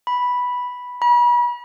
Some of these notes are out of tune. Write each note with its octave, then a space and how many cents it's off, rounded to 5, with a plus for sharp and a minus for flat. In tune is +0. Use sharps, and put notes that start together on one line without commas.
B5 -5
B5 -35